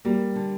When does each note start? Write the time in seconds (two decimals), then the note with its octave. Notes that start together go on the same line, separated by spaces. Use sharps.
0.05 G3 A#3
0.36 D3